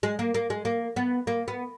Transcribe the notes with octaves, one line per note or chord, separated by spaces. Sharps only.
G#3
A#3
A#3
G#3
A#3
B3
A#3
B3